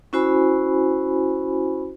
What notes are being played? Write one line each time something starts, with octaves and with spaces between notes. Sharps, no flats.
C#4 E4 F#4 C5 G#5 B5